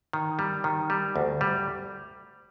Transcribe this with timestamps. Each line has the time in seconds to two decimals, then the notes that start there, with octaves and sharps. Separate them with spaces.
0.13 D#3
0.39 G3
0.64 D#3
0.90 G3
1.16 D2
1.41 G3